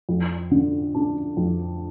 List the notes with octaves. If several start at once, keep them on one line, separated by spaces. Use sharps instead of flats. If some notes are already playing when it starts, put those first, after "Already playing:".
F2
D3
D4
F2